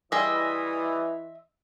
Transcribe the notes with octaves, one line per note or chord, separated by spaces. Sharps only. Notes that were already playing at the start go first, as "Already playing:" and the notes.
E3 G3 G#4 D#5 E5 C6 D#6